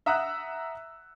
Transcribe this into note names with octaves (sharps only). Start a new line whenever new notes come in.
E5 F#5 A#5 D#6 E6 F#6